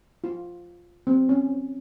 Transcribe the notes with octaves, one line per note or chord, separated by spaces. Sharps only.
F4
C4
C#4